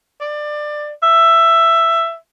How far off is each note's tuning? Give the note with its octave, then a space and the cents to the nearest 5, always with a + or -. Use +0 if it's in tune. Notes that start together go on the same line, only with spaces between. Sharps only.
D5 +20
E5 +10